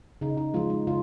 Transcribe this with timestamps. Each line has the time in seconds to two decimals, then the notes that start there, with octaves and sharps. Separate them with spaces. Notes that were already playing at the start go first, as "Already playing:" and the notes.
0.21 C#3 D#4
0.37 D#4
0.54 F3 G#3 F4
0.70 D#4
0.87 C#3 F4